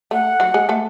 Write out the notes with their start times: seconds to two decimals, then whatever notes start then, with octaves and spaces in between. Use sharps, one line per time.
0.11 A3 F#5
0.40 F#3 F#4
0.54 G#3 G#4
0.69 A3 A4